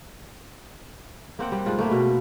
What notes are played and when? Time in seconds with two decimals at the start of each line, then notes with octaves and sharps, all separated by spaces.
1.39 A#3 C4 F#5 G5
1.52 G3
1.66 G#2 D4 F4
1.78 A3 A#3 E4
1.91 B2